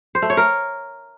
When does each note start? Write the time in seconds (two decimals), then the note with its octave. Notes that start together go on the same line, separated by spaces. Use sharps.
0.15 C5
0.22 A3
0.30 C#5
0.37 A#4